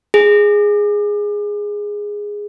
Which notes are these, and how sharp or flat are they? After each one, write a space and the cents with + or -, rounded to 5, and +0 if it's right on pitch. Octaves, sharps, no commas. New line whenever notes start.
G#4 -5